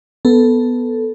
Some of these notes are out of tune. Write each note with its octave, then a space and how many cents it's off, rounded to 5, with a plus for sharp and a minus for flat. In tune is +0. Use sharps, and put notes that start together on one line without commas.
B3 +0 A4 +0